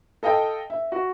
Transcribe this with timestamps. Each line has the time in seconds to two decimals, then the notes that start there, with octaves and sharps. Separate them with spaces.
0.23 A4 D#5 F5 G5 A5
0.70 E5
0.92 F#4